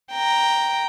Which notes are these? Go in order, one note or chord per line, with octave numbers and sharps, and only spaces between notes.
G5 A#5